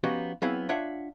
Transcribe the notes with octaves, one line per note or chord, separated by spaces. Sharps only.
F3 B3 C#4 D#4 F#4 G4
F#3 B3 C4 E4 G#4 F5
D4 F4 C#5 E5 F#5